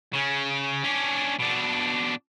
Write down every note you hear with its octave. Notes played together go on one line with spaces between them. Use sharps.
C#3 C#4
C#4 D4
B2 D4